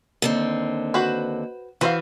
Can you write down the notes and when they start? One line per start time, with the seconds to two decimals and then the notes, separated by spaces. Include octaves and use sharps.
0.22 D#2 D3 C4
0.94 F#4 B4 C5
1.81 E3 F#4 C5 F5